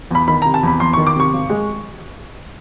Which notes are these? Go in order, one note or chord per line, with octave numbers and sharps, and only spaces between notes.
E2 B5
D#3 B5
C3 A#5
A5
E2 B5
E2 C6
D#3 C#6
D6
C3 C#6
G#1
G#3